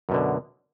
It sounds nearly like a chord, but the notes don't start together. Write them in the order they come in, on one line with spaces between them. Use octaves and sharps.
F#2 B2 D3